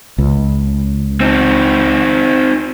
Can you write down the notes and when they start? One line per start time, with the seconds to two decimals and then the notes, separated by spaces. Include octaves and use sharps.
0.18 C#2
1.21 C4 D#4